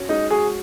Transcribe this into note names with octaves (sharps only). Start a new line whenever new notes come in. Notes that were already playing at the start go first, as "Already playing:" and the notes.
Already playing: C#4 F#4 C#5
G#3 D#4
F#4 G#4